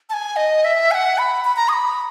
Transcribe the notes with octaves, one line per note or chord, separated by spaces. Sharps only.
A5
G#5
D#5
E5
G#5
F#5
B5
B5
A#5
D#6
B5